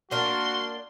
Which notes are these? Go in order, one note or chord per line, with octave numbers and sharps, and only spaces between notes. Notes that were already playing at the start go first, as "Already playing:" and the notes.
A#3 D4 F#4 A#4 C6